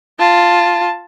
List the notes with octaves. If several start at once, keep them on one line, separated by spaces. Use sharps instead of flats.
F4 A5